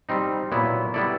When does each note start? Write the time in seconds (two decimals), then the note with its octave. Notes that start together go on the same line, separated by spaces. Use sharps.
0.09 G3 C4 D#4
0.51 A#2 F#3 B3 E4
0.94 G3 B3 E4 A4 D5